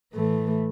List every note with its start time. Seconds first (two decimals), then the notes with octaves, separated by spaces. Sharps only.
0.14 A2 E3 A3